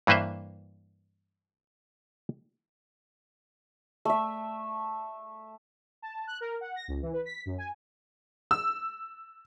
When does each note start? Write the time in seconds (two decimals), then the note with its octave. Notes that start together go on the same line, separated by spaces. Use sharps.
0.07 G2 E3 A#3 B4 C5 E5
4.05 A3 E5
6.02 A5
6.27 F#6
6.41 A#4
6.61 F#5
6.76 A#6
6.88 C#2
7.02 E3
7.13 B4
7.25 B6
7.46 F#2
7.58 G#5
8.51 E6